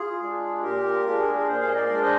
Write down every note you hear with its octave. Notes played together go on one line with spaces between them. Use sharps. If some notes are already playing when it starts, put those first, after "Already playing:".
Already playing: F4 G#4
G#3 D4
A#2 G4 A#4
F4
G#3 D4 G4
G#4
A#4
A#2 G#4 C5
F5
D#5
A#4 D5
G#3 D4
C5 D#5